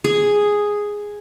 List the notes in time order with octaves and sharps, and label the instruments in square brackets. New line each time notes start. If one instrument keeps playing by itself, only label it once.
[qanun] G#4